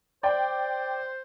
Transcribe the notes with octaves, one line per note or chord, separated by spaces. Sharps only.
C5 D5 G5